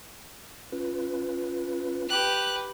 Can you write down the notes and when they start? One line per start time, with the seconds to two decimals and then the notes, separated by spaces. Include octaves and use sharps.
0.72 C#4 F4 B4
2.09 G4 B4 F#6